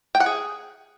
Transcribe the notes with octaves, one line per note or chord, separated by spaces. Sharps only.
G5
F#5
G#4